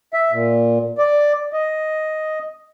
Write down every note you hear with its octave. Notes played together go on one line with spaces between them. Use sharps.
E5
A#2
D5
D#5